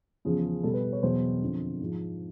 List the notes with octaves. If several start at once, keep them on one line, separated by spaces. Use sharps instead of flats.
E2 C#3 F3 G#4
B2 G3 A4
B4
C#5
E2 B2 F#3 C5
F2 D3 F3
G#2 F3